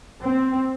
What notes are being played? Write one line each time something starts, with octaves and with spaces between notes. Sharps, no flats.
C4